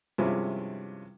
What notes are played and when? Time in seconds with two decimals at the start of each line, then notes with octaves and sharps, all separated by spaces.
0.18 G2 C3 F3 G#3 C#4 E4